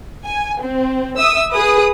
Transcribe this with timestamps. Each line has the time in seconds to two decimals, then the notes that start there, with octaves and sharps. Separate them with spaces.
0.25 G#5
0.60 C4
1.17 E5 D#6 E6
1.51 G#4 B4 D#6